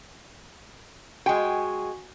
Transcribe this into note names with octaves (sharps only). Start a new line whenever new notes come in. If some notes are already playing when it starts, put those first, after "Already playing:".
G#3 F#4 G5 G#5 C#6